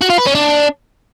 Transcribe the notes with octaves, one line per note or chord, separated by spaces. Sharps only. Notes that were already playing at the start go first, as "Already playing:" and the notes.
F#4
F4
B4
C#4
D4